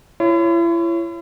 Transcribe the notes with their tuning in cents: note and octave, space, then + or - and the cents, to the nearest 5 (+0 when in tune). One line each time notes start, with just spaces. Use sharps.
E4 +40 C#5 -5